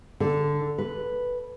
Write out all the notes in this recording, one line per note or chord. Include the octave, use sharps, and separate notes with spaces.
D3
B4